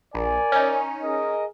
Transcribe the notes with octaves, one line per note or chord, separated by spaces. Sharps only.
A#1 A#4 D5 G#5
C#4 D#4
G#4 A#4 D#5